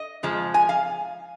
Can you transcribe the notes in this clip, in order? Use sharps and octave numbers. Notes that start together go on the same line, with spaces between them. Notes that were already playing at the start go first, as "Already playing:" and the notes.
Already playing: D#5
F2 F3 G#3
G#5
F5